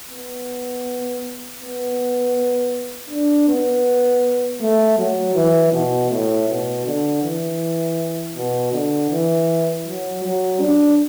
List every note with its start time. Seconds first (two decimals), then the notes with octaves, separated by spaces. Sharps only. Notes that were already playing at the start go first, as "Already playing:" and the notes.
0.10 B3
1.60 B3
3.10 D4
3.48 B3
4.61 A3
4.98 F#3
5.35 E3
5.73 B2
6.10 A2
6.49 B2
6.86 D3
7.23 E3
8.35 B2
8.73 D3
9.10 E3
9.86 F#3
10.24 F#3
10.61 D4